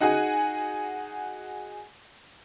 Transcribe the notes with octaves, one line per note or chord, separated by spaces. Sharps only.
D#4 F#4 G#4 F#5 G#5